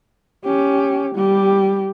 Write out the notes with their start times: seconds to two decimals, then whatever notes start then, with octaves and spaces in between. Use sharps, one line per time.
0.44 C#4 G4
1.15 G3 G4